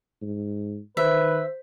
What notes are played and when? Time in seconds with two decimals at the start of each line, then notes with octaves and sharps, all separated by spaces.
0.22 G#2
0.97 D#3 B4 C5 E5